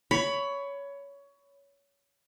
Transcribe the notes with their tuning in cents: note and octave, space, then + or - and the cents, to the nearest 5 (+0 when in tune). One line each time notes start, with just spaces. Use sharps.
C#5 +20 B5 +10